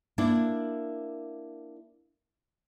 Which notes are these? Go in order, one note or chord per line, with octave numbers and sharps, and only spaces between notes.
A#3 D4 E4